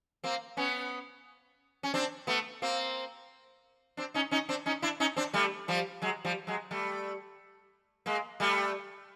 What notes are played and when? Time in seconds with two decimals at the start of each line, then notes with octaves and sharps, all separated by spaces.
0.24 A#3 C4
0.57 B3 C#4
1.83 C#4
1.94 C4 D4
2.27 A3 B3
2.62 A#3 C4
3.97 C4 D4
4.14 C#4 D#4
4.31 C#4 D#4
4.49 C4 D4
4.66 C#4 D#4
4.82 D4 E4
5.00 C#4 D#4
5.16 C4 D4
5.34 G3 A3
5.68 F3 G3
6.02 F#3 G#3
6.25 F3 G3
6.47 F#3 G#3
6.71 G3 A3
8.06 G#3 A#3
8.40 G3 A3